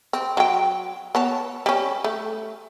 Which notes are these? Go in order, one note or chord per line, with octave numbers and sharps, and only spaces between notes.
C4
F#3 G5
B3 C#5 A5
G3 C#4
A3